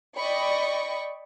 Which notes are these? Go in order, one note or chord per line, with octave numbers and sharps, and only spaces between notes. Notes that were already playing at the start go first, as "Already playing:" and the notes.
D5 D#5 G5 B5 C#6